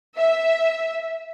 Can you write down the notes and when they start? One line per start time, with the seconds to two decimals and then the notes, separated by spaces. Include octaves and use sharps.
0.17 E5